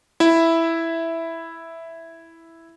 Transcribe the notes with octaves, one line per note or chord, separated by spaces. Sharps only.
E4 E5